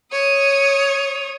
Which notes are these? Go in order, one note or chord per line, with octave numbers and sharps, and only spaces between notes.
C#5 D#6